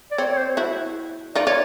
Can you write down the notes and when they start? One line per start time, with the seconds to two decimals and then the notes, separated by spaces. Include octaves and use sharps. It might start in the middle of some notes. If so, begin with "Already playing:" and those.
0.11 D5
0.18 C4 C#5
0.33 C#5
0.38 C5
0.57 E4 F#4
1.35 D#4 F4 D5
1.47 F4 C#5